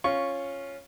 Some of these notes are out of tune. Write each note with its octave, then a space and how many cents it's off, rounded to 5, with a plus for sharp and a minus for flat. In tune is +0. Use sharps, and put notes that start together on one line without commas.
C#4 -5 F4 +0 C#6 +0